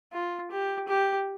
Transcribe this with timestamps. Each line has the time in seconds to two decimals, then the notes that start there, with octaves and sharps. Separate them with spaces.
0.12 F4
0.51 G4
0.88 G4